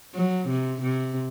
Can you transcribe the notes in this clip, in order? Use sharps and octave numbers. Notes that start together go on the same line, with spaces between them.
F#3
C3
C3